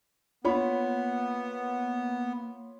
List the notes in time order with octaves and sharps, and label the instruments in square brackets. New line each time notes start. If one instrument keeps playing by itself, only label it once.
[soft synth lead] A#3 [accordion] B3 [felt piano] F4 C#5 B5